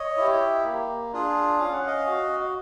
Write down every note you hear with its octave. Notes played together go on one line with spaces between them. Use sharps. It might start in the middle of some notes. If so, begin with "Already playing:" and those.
Already playing: C#5 D#5
E4 G4
A#3
D4 F4 G#4
C#4 F5
F#5
D#5 F5
F#4